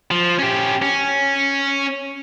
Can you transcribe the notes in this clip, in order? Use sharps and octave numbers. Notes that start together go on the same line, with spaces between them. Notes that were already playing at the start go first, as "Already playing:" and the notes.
F3
C#4 G4
C#4